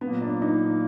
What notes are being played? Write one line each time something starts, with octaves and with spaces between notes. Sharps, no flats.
A#2 F#3 A#3 B3
D4
D#4